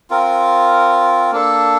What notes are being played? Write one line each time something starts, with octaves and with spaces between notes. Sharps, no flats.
C4 F4 A#4
A#3 D4 A4